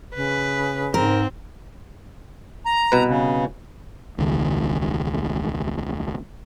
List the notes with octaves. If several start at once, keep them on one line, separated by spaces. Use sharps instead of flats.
C#3 B4
G#2 C4 A#4
A#5
C2 B2 B4
C#3
E1 C#2 D#3